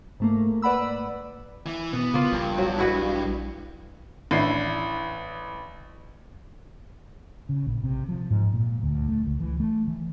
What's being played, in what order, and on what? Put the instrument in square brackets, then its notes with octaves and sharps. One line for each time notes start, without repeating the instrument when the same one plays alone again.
[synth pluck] G#2 A3 A#3
B4 D5 F#5 B5 E6
[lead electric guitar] E3
[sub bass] B2 [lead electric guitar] B3
[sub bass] C#3 [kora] A#3 F4
[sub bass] A#1 [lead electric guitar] G2
[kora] F#3
E4 F#4 B4
[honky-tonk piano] A1 D4 E4 C7
[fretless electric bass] C#3
A#1
C3
F3
G#2
A#2
D2
A3
C#2
E3
A3
E3